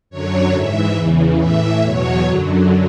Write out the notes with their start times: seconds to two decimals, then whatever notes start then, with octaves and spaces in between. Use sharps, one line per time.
0.10 F#2 D3 F#3 C#5
0.53 G#2 E3 E5
0.96 E2 C#3 E3
1.39 A2 E3 E5
1.81 E2 B2 F#3 C#5
2.23 F#2 D3 F#3